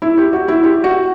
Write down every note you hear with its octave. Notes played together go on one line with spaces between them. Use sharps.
E4
G4
F#4
E4
G4
F#4